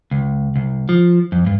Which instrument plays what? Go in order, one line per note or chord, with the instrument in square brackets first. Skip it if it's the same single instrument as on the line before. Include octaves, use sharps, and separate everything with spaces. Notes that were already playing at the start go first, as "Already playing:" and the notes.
[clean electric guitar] C#2
C2
F3
F2
G2